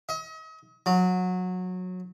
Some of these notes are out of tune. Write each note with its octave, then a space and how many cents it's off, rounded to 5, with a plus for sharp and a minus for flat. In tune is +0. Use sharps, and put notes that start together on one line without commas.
D#5 +40
F#3 -20